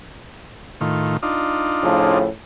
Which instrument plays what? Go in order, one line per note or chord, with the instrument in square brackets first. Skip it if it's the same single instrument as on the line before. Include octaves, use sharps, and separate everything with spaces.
[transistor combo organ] A2 D#3 F4
D4 D#4 F4
[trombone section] A2 C#3 F3